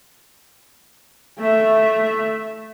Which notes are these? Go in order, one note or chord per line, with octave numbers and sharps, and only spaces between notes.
A3 E5